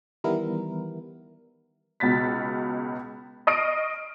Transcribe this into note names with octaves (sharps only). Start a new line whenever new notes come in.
D#3 E3 G3 B3 E4 A#4
C#2 B2 A6 B6
D#5 C#6 D#6 F6 C7 D7